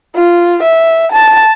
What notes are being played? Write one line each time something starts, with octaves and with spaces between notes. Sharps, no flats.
F4
E5
A5